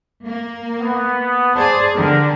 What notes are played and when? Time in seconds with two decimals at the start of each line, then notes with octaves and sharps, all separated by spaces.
0.25 A#3
0.80 B3
1.56 G#4 C5 D5 A5
1.95 D3 G4 A#4